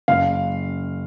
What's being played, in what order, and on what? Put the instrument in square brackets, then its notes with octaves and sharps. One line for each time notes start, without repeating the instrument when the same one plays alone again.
[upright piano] F#1 F5